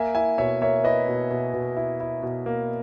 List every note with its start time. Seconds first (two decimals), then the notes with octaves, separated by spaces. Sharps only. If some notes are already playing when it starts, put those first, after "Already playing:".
Already playing: A#3 E5 G#5
0.15 E4 E5 G#5
0.38 B2 C#5 E5
0.61 A#3 C#5 E5
0.84 E4 B4 D#5
1.08 B2
1.30 B2
1.54 B2
1.77 E4
2.00 E4
2.23 B2
2.46 A#3